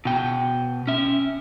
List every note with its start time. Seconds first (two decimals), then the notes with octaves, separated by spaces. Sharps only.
0.05 B2 G5
0.87 C#4 E5